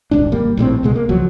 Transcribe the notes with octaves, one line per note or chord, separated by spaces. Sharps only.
D#1 C2 G#2 D4
G#1 G3 A#3
A#1 A2 F#3 C4
C#2 B2 G#3
A#3
C#2 F3 F#3